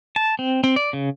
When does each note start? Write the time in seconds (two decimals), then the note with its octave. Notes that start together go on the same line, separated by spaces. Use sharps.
0.16 A5
0.39 C4
0.64 C4
0.76 D5
0.93 C#3